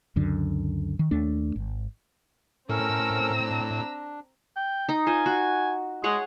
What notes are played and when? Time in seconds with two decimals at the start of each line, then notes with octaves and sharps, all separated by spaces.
0.16 C#2 F#2 D3
0.99 D#3
1.11 D#2 A3 D4
1.56 G#1
2.69 A2 C4 C#4 A4 A#4 A#5 E6
3.45 D4
4.56 G5
4.89 D#4 D#5
5.06 F4 C5 D#5 G#5
5.26 F#4
6.04 G#3 G#4 C#5 F#5